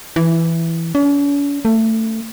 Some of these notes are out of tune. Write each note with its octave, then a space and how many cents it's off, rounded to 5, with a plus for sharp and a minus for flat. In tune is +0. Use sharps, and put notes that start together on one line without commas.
E3 +5
C#4 +45
A3 +20